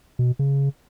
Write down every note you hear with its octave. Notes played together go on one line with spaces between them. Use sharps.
B2
C#3